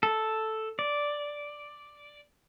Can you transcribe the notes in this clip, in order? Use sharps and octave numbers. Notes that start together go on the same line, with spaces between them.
A4
D5